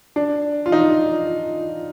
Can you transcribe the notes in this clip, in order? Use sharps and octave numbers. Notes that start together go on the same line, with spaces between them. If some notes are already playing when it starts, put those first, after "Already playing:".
D4
F4
D#4